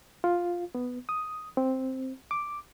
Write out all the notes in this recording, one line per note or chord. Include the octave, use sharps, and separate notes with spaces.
F4
B3
D#6
C4
D6